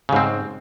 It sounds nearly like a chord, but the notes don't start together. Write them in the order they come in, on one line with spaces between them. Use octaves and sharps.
C#3 G#2 C4